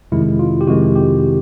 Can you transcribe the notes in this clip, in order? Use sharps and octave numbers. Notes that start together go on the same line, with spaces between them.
F2 C3 D#3 G#3 E4
F4
G4
F2 C3 D#3 G#3 F#4
G4